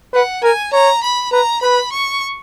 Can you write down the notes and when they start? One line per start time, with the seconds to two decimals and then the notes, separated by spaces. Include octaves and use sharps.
0.13 B4 F#5
0.43 A#4 G#5
0.72 C#5 A#5
1.03 B5
1.32 B4 A#5
1.61 B4 B5
1.92 C#6